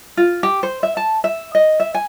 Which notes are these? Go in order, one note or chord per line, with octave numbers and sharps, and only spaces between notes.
F4
G4
C5
E5
A5
E5
D#5
E5
G#5